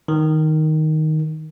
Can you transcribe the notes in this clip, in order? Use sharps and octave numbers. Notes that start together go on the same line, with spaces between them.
D#3